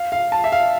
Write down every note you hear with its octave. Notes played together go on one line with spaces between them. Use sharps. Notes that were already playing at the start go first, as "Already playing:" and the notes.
Already playing: F5
F5
A5
E5
F5